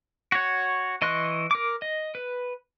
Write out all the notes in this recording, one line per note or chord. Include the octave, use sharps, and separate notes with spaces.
F#4 C#5
E3 D#5 C6 C#6 F#6
A#4 D6
D#5
B4